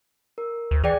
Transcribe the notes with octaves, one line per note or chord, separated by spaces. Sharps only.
A#4
D2
E3 G#4 D5 G5